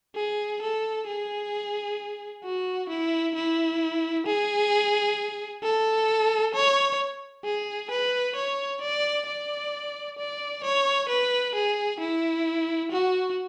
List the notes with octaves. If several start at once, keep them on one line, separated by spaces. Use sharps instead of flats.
G#4
A4
G#4
F#4
E4
E4
G#4
A4
C#5
G#4
B4
C#5
D5
D5
D5
C#5
B4
G#4
E4
F#4